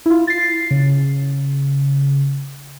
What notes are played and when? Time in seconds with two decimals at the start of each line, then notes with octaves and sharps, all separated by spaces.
0.06 E4 F4
0.27 A6 C7
0.71 C#3